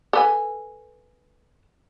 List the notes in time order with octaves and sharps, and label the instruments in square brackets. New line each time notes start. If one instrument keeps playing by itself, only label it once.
[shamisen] A4 B4 G#5